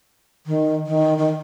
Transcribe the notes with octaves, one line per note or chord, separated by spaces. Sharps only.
D#3
D#3
D#3